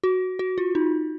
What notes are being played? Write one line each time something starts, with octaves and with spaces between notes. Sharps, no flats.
F#4
F#4
F4
D#4